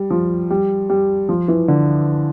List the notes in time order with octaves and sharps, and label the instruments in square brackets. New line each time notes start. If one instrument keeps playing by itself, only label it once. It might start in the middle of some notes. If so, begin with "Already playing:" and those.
Already playing: [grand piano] G3
F3
G3
G3
F3
E3
D3